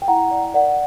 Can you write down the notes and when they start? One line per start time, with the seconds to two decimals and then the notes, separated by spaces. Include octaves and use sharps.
0.02 G5
0.08 E4 F#5 A#5
0.31 D5
0.54 A#4 D5 F#5